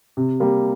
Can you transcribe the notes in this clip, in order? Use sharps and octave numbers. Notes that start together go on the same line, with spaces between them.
C3
G3 A#3